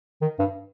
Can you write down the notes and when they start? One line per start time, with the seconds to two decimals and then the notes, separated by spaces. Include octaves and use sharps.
0.22 D#3
0.39 G2